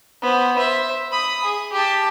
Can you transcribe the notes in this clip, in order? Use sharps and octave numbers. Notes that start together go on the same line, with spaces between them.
B3 C5
C5 E5
B5 D#6
G#4
G4 A5